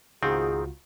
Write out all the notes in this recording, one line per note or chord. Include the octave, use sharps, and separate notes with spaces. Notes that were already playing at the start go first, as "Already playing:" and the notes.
C#2 G#2 D#3 C4 F4 F#4 G#4